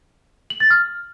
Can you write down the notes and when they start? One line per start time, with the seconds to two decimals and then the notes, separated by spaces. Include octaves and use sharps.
0.50 F#7
0.60 A6
0.70 F6